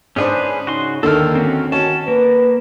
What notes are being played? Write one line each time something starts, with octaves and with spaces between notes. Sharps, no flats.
G#2 C#4 D4 G#4 B4 C5
C#3 D#4 F#4 C6
D#2 D3 D#3 A#3 A4 F6
C4 C#4 F#4
D#3 C#4 F#4 A5
A#3 B4